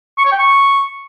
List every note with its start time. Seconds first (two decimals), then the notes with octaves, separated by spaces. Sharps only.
0.18 C#6
0.25 C#5
0.32 G5
0.39 C#6